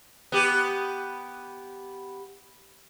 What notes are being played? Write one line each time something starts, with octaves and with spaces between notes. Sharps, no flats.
B3 G4